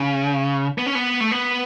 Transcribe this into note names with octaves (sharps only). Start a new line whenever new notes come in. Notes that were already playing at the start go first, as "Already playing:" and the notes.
Already playing: C#3
B3
C#4
B3
A3
B3